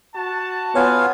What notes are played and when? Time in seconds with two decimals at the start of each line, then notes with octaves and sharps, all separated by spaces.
0.15 F#4 A5
0.75 B3 F4 C#5 F5 G#5